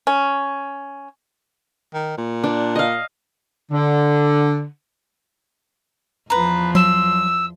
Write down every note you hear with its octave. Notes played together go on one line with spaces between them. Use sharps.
C#4
D#3
A#2
D4
D#5 F5
D3
E2 F3 B4 A#5
F#3 C6 E6